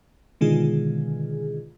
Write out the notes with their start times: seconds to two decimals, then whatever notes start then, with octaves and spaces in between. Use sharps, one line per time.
0.41 B2 D3 D#3 G#3 F4 G#4